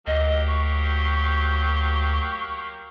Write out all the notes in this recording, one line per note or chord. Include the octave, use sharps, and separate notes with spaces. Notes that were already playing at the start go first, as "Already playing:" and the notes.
D2 F#3 A#3 G4 D#5
C#6